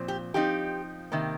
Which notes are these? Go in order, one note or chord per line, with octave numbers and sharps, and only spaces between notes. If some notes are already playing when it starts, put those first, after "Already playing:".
Already playing: A#2 F3 C4
G4
F3 C4 D#4 G4
C3 D#3 A#3